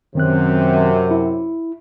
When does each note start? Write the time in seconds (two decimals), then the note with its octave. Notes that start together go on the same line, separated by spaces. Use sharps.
0.15 F#2 C3 D#3 C4 F#6
1.11 E4